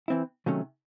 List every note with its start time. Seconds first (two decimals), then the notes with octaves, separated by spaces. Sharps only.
0.08 E3 C4 E4
0.46 C3 D#3 F#3 A3 C#4